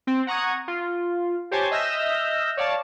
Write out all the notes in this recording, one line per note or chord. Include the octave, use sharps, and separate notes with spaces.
C4
F#5 A#5 C#6 D#6 G#6
F4
G4 C5 C#5 G#5 A5
D#5 E5 E6 F6 G6 A#6
C#5 D5 F5 A5